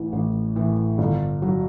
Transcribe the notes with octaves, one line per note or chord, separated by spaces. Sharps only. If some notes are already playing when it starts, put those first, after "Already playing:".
Already playing: A1 A2 E3
A1
A2 E3
G1
F#3